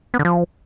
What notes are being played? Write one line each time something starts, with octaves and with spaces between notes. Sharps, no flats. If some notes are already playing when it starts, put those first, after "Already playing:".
B3
D3
F3